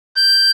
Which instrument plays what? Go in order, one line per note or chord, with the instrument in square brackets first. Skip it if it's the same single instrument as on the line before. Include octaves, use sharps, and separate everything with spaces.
[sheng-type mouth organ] G6